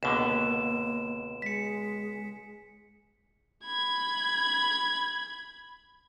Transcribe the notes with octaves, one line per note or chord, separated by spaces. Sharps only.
C#2 B2 D3 A#3 E7
G#3 B6 C#7
B5 G#6